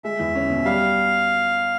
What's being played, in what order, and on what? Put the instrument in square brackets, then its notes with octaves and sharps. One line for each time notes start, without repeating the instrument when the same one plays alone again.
[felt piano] G#3 [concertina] E5
[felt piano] E2
C#4
B2
[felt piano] G3 [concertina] F5